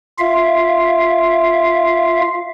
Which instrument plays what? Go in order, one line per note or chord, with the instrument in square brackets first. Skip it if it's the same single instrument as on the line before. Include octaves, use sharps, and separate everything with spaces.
[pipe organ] F4 E5 F5